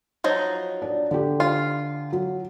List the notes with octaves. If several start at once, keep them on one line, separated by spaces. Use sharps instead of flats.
F3 F#3 D#4
D4
D3 G4
F4
F#3